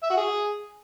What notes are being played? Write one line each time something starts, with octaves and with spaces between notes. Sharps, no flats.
E5
F#4
G#4